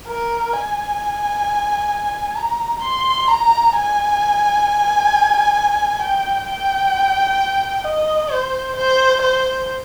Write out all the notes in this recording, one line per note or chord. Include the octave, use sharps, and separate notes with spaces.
A#4
G#5
A#5
C6
A#5
G#5
G5
G5
D#5
C5
C5
C5